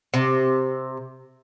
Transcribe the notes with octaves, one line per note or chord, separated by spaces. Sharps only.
C3